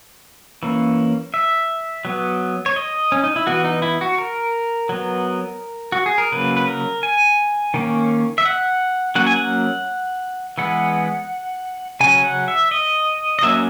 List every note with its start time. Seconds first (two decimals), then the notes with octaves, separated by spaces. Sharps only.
0.63 E3 A#3 C#4
1.34 E5
2.05 F#3 B3
2.66 C#5
2.76 D#5
3.12 C#4
3.24 D#4
3.36 E4
3.47 E3 B3 F#4
3.64 D#4
3.82 E4
4.01 F#4
4.18 A#4
4.89 F#3 B3
5.92 F#4
6.06 G#4
6.18 A#4
6.32 C#3 F#3 A#3 B4
6.57 B4
6.68 A#4
7.03 G#5
7.74 D#3 A#3 C#4
8.38 E5
8.45 F#5
9.15 F#3 A#3 C#4 F#5
9.27 G#5
9.36 F#5
10.58 E3 G#3 B3 F#5
12.00 C#3 F#3 C#4 G#5
12.24 F#5
12.48 E5
12.71 D#5
13.39 D#5
13.42 F#3 A#3 C#4 E5